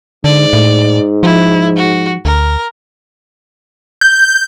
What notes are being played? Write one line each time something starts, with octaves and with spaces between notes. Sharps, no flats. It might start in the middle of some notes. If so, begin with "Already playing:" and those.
G#2 D3 D5
A2
F3 E4
F#4
D2 A#4
G6